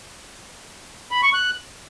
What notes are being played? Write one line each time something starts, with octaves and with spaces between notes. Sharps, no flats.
B5
C#6
F#6